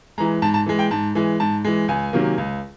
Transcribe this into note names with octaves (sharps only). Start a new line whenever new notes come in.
E3 G#3 A#5
G#2 A5
A5
E3 G#3
G5
G#2 A5
E3 G#3
G#2 A5
E3 G#3
C#2 G#5
C3 D#3 F#3 A#3
C#2